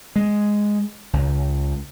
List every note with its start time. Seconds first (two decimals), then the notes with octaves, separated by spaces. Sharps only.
0.16 G#3
1.13 C#2